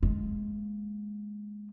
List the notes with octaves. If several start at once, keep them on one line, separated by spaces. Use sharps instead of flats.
G#3 A#3